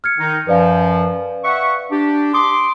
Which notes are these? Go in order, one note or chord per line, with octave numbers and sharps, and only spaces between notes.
F6 G#6 C#7
D#3 D#4
F#2 F3 B4 D5 F5
E5 F#5 C#6
D4 G4
C6 D6 D#6